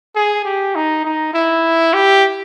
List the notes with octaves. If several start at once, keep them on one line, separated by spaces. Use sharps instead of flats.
G#4
G4
D#4
D#4
E4
G4